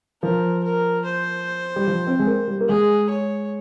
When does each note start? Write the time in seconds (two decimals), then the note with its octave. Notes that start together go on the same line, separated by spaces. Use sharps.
0.22 F3 A#4
0.64 A#4
1.05 C5
1.76 G3
1.87 F3
2.07 C4
2.19 G#3
2.27 A#3
2.48 G3
2.60 A#3
2.68 G#3 G#4
3.10 C#5